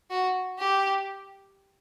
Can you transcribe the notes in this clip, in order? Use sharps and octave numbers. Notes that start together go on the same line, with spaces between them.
F#4
G4